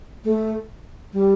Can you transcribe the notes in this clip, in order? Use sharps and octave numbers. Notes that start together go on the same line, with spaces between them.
A3
G3